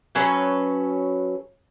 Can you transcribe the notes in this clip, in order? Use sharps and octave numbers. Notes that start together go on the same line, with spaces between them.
F#3 C#4 A4 B4